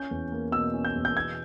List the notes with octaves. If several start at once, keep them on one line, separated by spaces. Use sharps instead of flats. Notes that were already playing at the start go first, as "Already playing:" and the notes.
Already playing: C#4 G6
E2
A#3
B2 E6
C#4
G6
E2
G6
B2 G#6